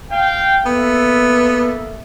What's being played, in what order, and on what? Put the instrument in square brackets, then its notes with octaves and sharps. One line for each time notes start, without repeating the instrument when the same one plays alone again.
[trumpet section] F5 G5
[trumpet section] A#3 A4 E5 [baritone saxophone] B3